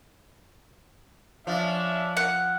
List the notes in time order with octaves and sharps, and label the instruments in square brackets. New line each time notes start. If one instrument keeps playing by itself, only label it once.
[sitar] F3 [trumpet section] C#4 D4 E5
[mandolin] F#5